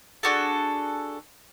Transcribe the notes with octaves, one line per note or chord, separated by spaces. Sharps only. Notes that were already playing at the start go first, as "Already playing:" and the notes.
D4 F#4 G#4 A4